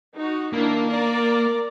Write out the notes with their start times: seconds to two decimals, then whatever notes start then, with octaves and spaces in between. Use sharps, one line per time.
0.13 D#4 F#4
0.53 D#3 A#3 D4 E4
0.87 A#4 D5 A#5